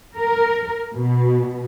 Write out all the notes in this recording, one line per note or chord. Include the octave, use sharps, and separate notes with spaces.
A#4
B2